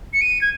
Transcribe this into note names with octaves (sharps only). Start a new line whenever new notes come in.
C#7
D#7
G#6